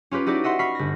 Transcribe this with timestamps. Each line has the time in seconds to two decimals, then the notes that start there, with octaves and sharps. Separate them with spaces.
0.11 C#4 F4 G4 B4
0.26 D#4 E4 F#4 G4 D5
0.44 D#5 E5 F#5 C6
0.59 B5 C#6 F6 B6 C7
0.75 G1 A#6